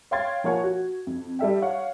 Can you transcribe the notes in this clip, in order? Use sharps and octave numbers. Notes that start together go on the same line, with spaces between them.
C#5 F5 G5 C6 G#6 A6
F3 A#3 C#5 F#5 G#5
F#4
F2
G3 A4 E5 G5
C#5 F5 F#5